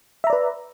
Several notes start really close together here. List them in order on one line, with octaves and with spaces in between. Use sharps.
E5 A#5 D5 B4